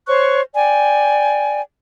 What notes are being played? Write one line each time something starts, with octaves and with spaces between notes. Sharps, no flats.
C5 C#5 C#6 F#6
D5 G5 G#5